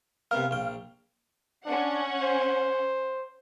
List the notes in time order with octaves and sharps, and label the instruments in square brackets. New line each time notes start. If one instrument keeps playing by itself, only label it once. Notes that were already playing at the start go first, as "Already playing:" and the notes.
[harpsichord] C3 B3 A#4 [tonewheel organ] F5
[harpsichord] A#1 G5
[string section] C#4 F#5 [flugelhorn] D4
[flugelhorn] C5